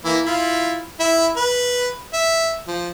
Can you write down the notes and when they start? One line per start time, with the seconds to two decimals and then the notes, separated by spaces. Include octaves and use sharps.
0.05 E3 A#3 E4
0.26 E4 F4
1.00 E4 E5
1.36 B4
2.13 E5
2.68 F3